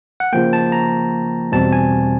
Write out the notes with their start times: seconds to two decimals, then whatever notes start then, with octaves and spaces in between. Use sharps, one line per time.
0.20 F#5
0.33 C#3 F3 A#3 G5
0.53 A5
0.72 A#5
1.52 E2 B2 G3 C4 A5
1.72 G#5